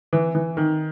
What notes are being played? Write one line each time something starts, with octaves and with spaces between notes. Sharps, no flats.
E3
E3
D#3